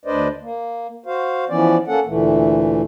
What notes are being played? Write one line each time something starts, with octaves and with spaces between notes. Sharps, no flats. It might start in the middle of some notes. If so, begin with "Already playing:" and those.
D2 D4 B4 C5 D5 D#5
A#3
F#4 C5 F5
E3 F3 B3 C#4 D5
A#3 C#4 A4 F#5
D2 A#2 E3 A3